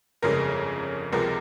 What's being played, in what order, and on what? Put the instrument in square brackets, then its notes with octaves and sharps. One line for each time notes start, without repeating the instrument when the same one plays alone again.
[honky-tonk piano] G1 F2 C#3 G#3 A#4
C#2 C3 F3 G#3 A#4